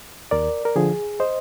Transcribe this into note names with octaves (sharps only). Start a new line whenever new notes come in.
D#2 A#4 D5
A#4
D3 F3 G#4
C5 D#5